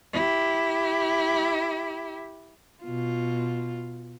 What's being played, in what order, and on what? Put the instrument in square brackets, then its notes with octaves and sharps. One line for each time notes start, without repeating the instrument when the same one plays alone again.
[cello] E4 G4
[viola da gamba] B2 F4